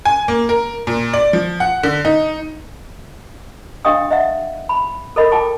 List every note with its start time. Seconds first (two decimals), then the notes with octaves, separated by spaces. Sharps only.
0.05 G#5
0.28 A#3
0.49 A#4
0.87 A#2
1.14 D5
1.33 F3
1.60 F#5
1.83 D3
2.05 D#4
3.85 D4 G4 D#5 F5 G5 D#6
4.10 D#5 E5 F#5
4.69 B5
5.16 A4 A#4 D#5 B5
5.32 F4 G5 A5 D6